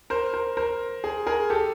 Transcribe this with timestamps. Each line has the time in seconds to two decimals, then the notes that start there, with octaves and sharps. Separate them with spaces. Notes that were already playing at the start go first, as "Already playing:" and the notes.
0.10 A#4 C5
0.33 A#4 C5
0.57 A#4 C5
1.04 G#4
1.27 G#4 A#4
1.50 G4 A4